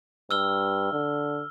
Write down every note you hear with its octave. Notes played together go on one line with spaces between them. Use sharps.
G2 E6 F6 G7
D3